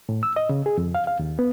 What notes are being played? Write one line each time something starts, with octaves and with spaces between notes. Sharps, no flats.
A2
E6
D#5
C#3
G#4
F2
F5
F5
D#2
B3